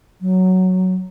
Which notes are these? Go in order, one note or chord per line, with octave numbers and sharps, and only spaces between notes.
F#3